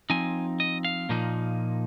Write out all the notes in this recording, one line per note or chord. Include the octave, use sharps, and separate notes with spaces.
F3 C4 D#4 G#5
D#5
F5
A#2 F3 A#3 D#4